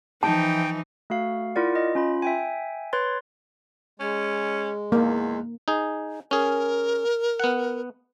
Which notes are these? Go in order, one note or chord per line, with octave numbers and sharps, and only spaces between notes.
E3 F3 D#4 G5 A5
A3 F#4 F5
E4 F4 A#4 D5 F#5
D#5
C#4 F4 B5
E5 G5 G#5
B4 C#5 C6 A6
G#3 C#4
E2 A#3
D#4 G#4
C#4 G#4 A#4
B3 F#5